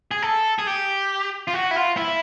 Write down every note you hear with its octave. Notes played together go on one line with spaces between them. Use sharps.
G#4
A4
G#4
G4
F4
F#4
E4
F4
E4